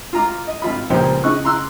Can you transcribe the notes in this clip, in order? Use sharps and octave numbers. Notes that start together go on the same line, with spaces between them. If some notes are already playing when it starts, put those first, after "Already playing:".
F4 A#5 D6
D#5
G#1 F4 B5
C#2 A#2 F3 G3 C5
C#3 D#5 C#6 F#6
C#3 A#5 C6 D6 E6 F#6